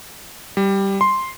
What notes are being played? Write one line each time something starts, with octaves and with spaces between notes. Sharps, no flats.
G3
C6